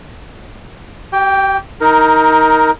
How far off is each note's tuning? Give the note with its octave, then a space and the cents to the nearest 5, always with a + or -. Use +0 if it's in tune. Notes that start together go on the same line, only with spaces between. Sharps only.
G4 -35 G5 +5
D#4 +20 A#4 +0